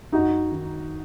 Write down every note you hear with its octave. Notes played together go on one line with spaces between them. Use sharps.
F#2 D#4 F#4
D#3